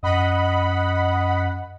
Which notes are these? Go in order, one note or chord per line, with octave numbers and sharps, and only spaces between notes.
F#2 D#5 F#5 B5